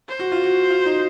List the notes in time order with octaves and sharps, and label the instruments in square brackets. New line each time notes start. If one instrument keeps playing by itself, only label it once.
[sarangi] C5
[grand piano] F#4
F4
F#4
F4
D#4